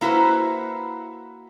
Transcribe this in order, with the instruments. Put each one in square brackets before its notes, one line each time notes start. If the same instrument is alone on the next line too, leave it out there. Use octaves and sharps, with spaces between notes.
[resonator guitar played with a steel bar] A#3 E4 F#4 B4 C5